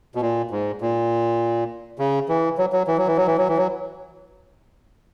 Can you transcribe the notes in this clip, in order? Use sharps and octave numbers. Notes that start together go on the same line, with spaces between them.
B2
A#2
G#2
A#2
C#3
E3
F#3
F#3
E3
F#3
E3
F#3
E3
F#3
E3
F#3